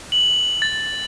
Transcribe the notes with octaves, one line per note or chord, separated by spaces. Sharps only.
F#7
A6